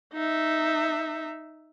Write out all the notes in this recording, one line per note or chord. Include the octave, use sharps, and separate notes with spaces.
D#4 E5